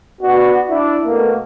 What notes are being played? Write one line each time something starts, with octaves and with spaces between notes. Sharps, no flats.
B3 D4 F#4
D4 E4
B2 A3 A#3